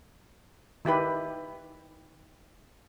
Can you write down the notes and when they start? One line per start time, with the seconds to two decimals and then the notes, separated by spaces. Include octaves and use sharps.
0.85 D#3 E4 G4 B4